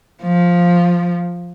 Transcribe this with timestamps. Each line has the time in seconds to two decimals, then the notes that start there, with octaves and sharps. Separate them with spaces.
0.23 F3